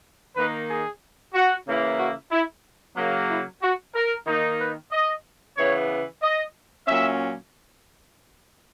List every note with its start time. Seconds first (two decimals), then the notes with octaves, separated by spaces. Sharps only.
0.36 D#3 A#3 D#4 B4
0.69 G#4
1.34 F#4
1.66 C#3 E3 A#3 E4
1.99 F#4
2.31 E4
2.96 C#3 F#3 A#3
3.29 E4
3.61 F#4
3.94 A#4
4.26 D#3 A#3 D#4
4.60 B4
4.91 D#5
5.57 C#3 E3 B3 C#5
6.22 D#5
6.87 A#2 F#3 C#4 E5